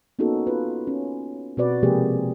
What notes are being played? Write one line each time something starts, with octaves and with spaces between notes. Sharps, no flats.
A#3 B3 C#4 D#4 F#4 A4
F4 B4
C#4
B2 C4 F#4 B4 D5
C3 F3 G#3 A#3 G4 G#4